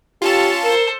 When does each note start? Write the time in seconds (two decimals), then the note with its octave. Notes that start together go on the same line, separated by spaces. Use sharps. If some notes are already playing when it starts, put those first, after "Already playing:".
0.22 C#4 F4 G4 A4 A5
0.64 A4 A#4 C5